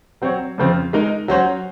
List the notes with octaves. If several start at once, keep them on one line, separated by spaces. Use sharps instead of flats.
F#3 C4 F#4 C#5
F2 C#3 F3 C4 F4
G#3 D#4 A#4
F#3 C#4 F#4 C5